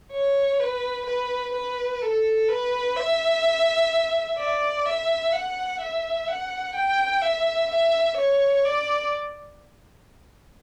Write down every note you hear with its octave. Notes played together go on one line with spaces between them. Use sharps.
C#5
B4
B4
B4
A4
B4
E5
D5
E5
F#5
E5
F#5
G5
E5
E5
C#5
D5